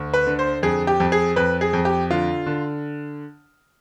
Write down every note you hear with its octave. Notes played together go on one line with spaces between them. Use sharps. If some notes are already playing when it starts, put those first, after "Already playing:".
Already playing: D2
B4
D3
C5
F2 G#4
G4
F2
G#4
F2 B4
G#4
F2
G4
D3 F4
D3